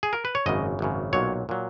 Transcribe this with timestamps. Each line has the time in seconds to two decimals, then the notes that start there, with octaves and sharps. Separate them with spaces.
0.03 G#4
0.13 A#4
0.25 B4
0.35 C#5
0.46 G#1 F#2 C#3 D#5
0.79 G#1 F#2 C#3
1.13 B1 A#2 F#3 C#5
1.49 A#2 F#3